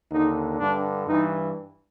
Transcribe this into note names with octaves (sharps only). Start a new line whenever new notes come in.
D#2 D3 D#4
G2 D3 D4
G2 E3 D#4